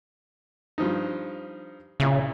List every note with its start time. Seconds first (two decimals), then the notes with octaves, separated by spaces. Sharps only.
0.78 G2 F3 D#4
2.00 A#2 C#3 E4